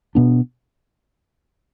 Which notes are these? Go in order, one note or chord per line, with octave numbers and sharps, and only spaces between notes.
B2 B3 D4